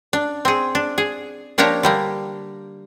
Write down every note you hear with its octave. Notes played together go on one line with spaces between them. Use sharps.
D4
C4 G#4
D4
G#4
F3 A#3 D4 G4 C#5 A#5
D3 G3 A#3